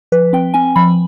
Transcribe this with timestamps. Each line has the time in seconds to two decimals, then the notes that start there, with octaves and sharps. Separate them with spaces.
0.12 F3 B4
0.33 C4 G5
0.54 C4 G#5
0.76 F3 B5